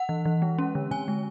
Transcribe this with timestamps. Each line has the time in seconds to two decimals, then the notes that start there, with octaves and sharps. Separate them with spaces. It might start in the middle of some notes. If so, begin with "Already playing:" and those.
Already playing: F#5
0.09 E3
0.25 E3
0.42 G#3
0.58 C#4
0.75 D3
0.91 D3 G#5
1.08 G#3